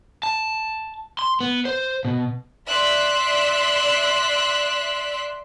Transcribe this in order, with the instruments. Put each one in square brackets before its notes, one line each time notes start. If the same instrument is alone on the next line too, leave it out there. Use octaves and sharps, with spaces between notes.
[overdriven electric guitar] A5
C6
B3
C5
B2
[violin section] D5 E5 C6 F#6 B6